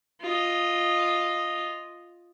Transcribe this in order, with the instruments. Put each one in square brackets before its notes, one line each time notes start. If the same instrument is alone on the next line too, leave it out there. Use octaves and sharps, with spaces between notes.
[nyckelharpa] F4 D#5